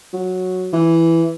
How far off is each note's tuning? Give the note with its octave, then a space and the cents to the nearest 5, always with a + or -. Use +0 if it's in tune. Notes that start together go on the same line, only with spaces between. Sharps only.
F#3 -5
E3 +5